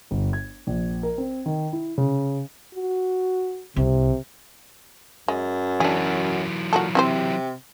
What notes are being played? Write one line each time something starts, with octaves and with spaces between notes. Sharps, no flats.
G1
G#6
A#1
A#4
C4
D#3
E4
C#3
F#4
C2 C3
F#2 G#3
E3 F#3 D4 G#4
A#2 F#4 G#4 A4
C3 C4 E4 C5